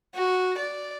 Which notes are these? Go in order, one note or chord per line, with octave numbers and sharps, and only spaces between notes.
F#4
D5